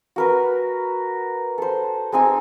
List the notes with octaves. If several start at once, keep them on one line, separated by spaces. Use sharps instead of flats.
F#4 A#4 B4
A4 C5
G#3 C4 D#4 G#5